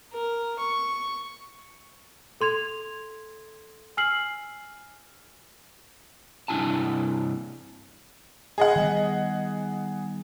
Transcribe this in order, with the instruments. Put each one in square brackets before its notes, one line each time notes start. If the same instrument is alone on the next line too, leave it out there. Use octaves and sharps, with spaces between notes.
[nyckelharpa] A#4
C#6
[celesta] A4 C6 G#6 F7
G#5 E6 F6 C7 F#7
[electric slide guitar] G2 C3 D4 E4 G#5 A5
[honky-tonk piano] G#4 D#5 F#5
[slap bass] D#3 G3 B3